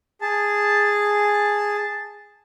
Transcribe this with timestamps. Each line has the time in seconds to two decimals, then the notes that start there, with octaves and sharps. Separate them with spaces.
0.21 G#4 A5